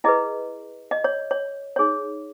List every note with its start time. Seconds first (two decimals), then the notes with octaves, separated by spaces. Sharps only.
0.04 E4 G#4 B4 D#5
0.91 D#5
1.04 C#5
1.31 C#5
1.76 D#4 G#4 C#5